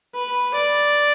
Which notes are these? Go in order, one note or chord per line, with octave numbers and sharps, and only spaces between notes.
B4
D5